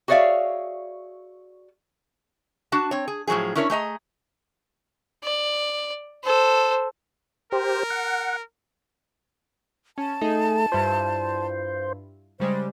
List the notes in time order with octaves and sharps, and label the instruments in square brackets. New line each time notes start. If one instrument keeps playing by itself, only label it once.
[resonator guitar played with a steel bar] F#4 G#4 C#5 D5 E5 F5
D4 F#4 A5
C4 C#5
G#4
A2 F3 F#3 A3 G#4
C#4 D4 E4 A#4 C5 C#5
A3 G#4 D#5 A#5
[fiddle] D5
A4 C5
[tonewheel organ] G4 C5 [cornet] A#4
[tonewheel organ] F#5
[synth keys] C#4 [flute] A5
[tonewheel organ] A3 [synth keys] D#4 G#4
[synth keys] G2 E4 F4 [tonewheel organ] C5
[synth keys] C#3 G3 G#3 [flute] C5